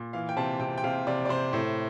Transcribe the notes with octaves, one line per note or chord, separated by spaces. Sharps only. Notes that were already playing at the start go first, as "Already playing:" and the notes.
Already playing: A#2
E3 F5
G5
C3 A5
C3 G5
G5
C3 F5
C3 D5
D5
C3 C5
A2